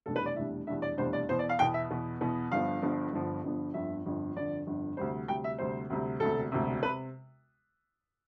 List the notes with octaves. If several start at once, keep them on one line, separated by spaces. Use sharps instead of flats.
F1 E2 B2 G3 D4 A4
B4
D5
F1 E2 B2 G3 D4 E5
F1 E2 B2 G3 D4 E5
D5
F1 E2 B2 G3 D4 C5
D5
E2 B2 B3 C5
D5
F5
E2 B2 B3 G5
E5
E2 B2 B3
E2 B2 B3
G1 G2 D3 F3 B3 F5
G1 G2 D3 F3 B3
G1 G2 D3 F3 B3
G1 G2 D3 F3 B3
G1 F2 D3 E5
G1 F2 D3
G1 F2 D3 D5
G1 F2 D3
D2 C3 G3 C5
D2 C3 G3 G5
E5
D2 C3 G3 C5
D2 C3 G3
E1 D2 C3 A4
E1 D2 C3
C3 B4